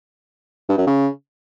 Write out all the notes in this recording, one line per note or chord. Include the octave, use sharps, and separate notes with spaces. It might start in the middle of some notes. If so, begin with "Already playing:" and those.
G2
F#2
C#3